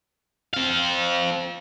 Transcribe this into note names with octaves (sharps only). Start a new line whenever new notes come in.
C4 F5